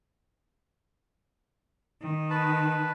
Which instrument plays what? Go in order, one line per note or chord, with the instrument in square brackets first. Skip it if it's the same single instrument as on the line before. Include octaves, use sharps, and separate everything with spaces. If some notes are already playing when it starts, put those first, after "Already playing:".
[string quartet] D#3
[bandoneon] B4 A5 B5